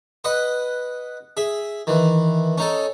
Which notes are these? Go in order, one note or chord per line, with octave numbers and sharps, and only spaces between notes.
B4 D#5 F#5
G#4 E5
D#3 E3
C#4 D#4 A4